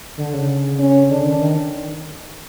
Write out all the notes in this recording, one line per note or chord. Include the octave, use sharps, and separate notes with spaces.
D3
C#3
C#4
D3 D4
D#3
D#3